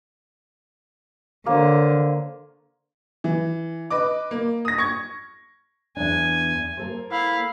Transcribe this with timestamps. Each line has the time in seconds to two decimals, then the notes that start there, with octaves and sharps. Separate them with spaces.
1.46 D3 A#3 C5 C#5
3.24 E3
3.90 B4 D#5 D6
4.31 A#3
4.65 D#6 A#6
4.78 C#6 G#6
5.97 E2 D4 G#5
6.77 A#3 A4 C5
7.12 E4 F5